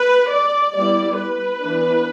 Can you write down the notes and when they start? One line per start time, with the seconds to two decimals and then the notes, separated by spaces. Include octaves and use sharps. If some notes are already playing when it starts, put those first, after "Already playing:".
Already playing: B4
0.31 D5
0.75 G3 B3 E4 D5
1.19 B4
1.63 E3 B3 D4